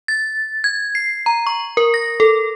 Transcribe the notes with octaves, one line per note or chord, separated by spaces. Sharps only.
A6
G#6
C7
A#5
C#6
A#4
A#6
A4